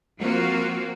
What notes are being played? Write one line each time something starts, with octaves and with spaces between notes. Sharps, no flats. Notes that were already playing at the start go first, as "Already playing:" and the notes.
F3 A#3 C4 F4 F#4